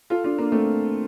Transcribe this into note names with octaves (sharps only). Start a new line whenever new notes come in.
F4 A4
D4 F4
A#3 D4
A3 C4